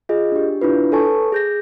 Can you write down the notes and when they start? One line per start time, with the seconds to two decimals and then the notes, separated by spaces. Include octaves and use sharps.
0.09 F4 G#4 D#5
0.32 D4 G4
0.61 D4 E4 F4 B4
0.92 A4 B4 C#5 G#5 A5 C#6
1.32 G#4 G6 A#6